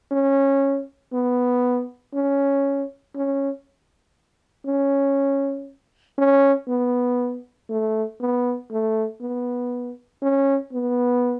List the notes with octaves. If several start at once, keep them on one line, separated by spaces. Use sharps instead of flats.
C#4
B3
C#4
C#4
C#4
C#4
B3
A3
B3
A3
B3
C#4
B3